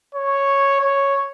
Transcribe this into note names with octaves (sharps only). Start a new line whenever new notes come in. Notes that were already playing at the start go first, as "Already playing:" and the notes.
C#5
C#5